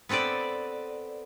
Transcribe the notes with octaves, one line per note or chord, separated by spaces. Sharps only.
B3 C4 A4 B4 D5